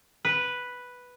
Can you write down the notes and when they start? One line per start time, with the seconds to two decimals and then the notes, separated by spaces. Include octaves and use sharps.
0.25 B4